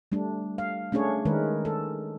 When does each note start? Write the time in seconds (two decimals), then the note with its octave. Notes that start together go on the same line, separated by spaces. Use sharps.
0.12 G3 A3 D4
0.58 F5
0.92 A3 C#4 D4 G#4 C#5
1.25 D#3 G#3 A#4 B4
1.65 A4